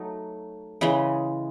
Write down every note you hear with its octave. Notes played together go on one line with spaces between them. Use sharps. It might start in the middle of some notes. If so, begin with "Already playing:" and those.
Already playing: F#3 A3 D#4
C#3 E3 G#3